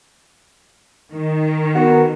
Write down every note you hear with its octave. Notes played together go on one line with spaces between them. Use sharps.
D#3
B3 F#4 A#4